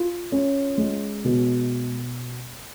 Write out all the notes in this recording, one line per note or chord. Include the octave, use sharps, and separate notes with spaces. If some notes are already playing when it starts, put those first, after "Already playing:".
Already playing: F4
C#4
G#3
B2